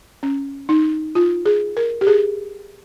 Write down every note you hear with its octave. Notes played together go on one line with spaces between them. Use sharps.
C#4
D#4
F4
G#4
A#4
G4
G#4